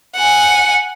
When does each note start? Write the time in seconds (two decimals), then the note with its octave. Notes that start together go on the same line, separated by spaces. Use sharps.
0.16 F#5 G#5